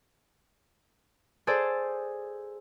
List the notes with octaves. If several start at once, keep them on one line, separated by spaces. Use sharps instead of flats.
G#4 A4 C5 D5